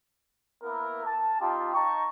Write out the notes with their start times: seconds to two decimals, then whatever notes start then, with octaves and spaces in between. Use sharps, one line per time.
0.63 A#3 B3 E4 A#4
1.06 A5
1.40 C4 D#4 F4 G4
1.74 D#4 A5 A#5 C#6